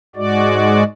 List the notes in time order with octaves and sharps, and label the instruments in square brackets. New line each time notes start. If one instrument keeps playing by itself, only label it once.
[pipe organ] G#2 G#3 F#4 D5